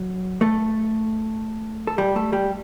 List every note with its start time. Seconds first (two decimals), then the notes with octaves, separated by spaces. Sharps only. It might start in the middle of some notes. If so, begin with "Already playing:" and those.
Already playing: F#3
0.41 A3 A4
1.87 A4
1.98 G3 G4
2.16 A3 A4
2.33 G3 G4